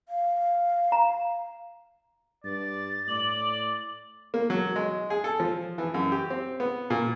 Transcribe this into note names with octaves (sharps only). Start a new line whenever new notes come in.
F5
A#5
G2 D5 A6
A2 D5 D6 F#7
A#3
F#3
G#3
G#4
A4
F3
E3
F#2
G4
C4
B3
A#2